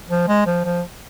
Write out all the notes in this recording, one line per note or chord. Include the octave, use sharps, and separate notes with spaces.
F3
G#3
F3
F3